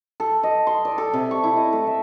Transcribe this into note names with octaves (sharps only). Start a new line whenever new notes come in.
A4
D#5
C6
D5
A4
C3
C#6
E4
D#5
A3
E5